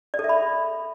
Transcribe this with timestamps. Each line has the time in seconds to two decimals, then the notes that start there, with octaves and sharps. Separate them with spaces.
0.14 D5
0.19 A4
0.24 E5
0.29 B5